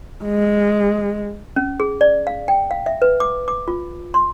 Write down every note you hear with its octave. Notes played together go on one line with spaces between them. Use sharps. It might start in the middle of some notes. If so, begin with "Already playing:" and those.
G#3
C#4
G#4
D5
F5
G5
F5
E5
B4
D6
D6
F4
C6